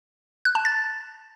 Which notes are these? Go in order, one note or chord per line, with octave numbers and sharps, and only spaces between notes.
F#6
A5
A6